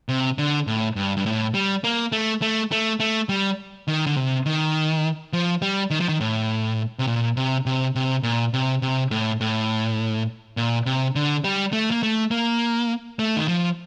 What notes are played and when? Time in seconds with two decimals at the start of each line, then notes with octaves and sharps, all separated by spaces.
0.09 C3
0.38 D3
0.67 A2
0.96 G2
1.17 G2
1.26 A2
1.54 G3
1.84 A#3
2.12 A3
2.42 A3
2.72 A3
3.00 A3
3.29 G3
3.88 D#3
4.06 D3
4.17 C3
4.46 D#3
5.33 F3
5.62 G3
5.90 D#3
6.00 F3
6.09 D#3
6.20 A2
6.99 C3
7.07 A#2
7.37 C3
7.66 C3
7.95 C3
8.23 A#2
8.54 C3
8.82 C3
9.11 A2
9.41 A2
10.57 A#2
10.86 C3
11.15 D3
11.44 G3
11.73 A3
11.91 A#3
12.03 A3
12.31 A#3
13.19 A3
13.36 D#3
13.48 F3